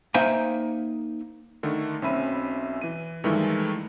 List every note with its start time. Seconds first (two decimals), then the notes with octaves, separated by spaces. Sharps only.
0.15 A#3 D#4 C5 E5 G5 G#5
1.63 D3 D#3 A3
2.02 B1 C4 C#4 E5 B5 D#7
2.82 E3 D#7
3.24 G2 D#3 E3 G#3 A3